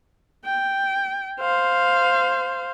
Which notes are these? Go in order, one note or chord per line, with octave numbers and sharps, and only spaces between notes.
G5
C5 F5